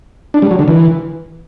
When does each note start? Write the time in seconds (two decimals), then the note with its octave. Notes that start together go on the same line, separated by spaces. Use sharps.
0.34 D4
0.42 G3
0.51 F#3
0.59 D3
0.68 E3